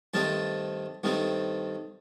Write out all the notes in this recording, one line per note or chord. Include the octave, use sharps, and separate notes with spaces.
G2 D#3 A3 C4 A5
G2 D#3 A3 C4